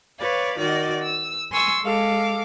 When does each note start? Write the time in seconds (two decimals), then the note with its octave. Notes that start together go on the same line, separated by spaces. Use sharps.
0.19 B4 C#5 D5 F5
0.58 D#3 F#4 D5 D#5
1.02 E6
1.51 G#5 C6 C#6 E6 A6
1.83 G#3 A4 F5 D6